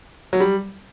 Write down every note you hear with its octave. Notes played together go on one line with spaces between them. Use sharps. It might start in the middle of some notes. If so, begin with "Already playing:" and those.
F#3
G3